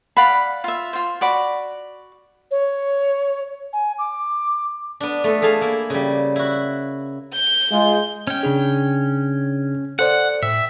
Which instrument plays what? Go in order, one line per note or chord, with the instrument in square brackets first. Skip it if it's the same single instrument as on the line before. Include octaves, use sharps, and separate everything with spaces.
[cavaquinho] D5 F5 F#5 B5
F4 E5
F4 C5
F#4 D5 B5
[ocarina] C#5
G#5
D6
[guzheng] B3 D4
A3 B3 A4
A3 G#4 F5 A5
A#3 E4
C#3 G3
E4 F#4
[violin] G6
[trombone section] G#3 F4
[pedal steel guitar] C#4 G5
[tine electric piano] C#3 D4 G#4
[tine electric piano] A4 C5 D5 [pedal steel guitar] F#5
[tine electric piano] A2 [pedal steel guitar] E5